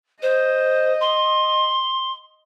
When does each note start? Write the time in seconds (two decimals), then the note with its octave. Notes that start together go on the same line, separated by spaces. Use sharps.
0.22 C5 D#5
1.00 C6